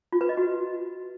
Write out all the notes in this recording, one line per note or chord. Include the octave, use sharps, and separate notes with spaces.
F4
B4
D#5
F#4